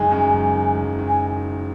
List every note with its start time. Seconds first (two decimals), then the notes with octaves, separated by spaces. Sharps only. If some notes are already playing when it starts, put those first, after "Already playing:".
Already playing: F#1 D#3 G#3 G#5
0.11 F#2
0.33 F#1
0.55 D#3
0.77 F#1
0.98 D#3
1.08 G#5